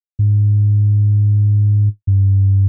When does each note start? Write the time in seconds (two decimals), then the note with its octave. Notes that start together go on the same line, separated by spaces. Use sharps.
0.19 G#2
2.07 G2